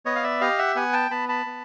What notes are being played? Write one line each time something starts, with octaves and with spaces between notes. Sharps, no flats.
B3 C#5 D#5
F5
D5 E5
G4 D#5 F5
E5 F#5
B3 F#5 G#5
G5 A5
B3 A5 B5
A5 B5
B3